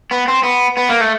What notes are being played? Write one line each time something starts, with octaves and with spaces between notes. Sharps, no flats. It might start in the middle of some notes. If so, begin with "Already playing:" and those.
B3
C4
B3
B3
A#3
A3